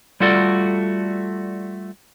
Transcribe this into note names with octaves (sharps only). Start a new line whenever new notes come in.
G3 A3 F4 F#4 A4 D5